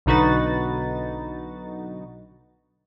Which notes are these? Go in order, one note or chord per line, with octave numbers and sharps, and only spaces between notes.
B1 D3 D#4 F#4 B4 A6